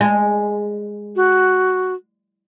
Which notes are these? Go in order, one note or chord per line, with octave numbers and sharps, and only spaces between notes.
G#3
F#4